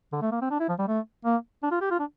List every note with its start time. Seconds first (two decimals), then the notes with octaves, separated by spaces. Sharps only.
0.13 D3
0.22 A3
0.32 A#3
0.41 C4
0.51 D4
0.60 E4
0.69 F3
0.79 G3
0.88 A3
1.25 A#3
1.63 D4
1.71 F4
1.81 G4
1.91 F4
1.99 D4